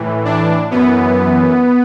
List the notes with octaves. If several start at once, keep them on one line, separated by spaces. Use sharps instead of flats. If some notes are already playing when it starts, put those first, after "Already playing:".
Already playing: A2 E3
D4
F#2 E3 B3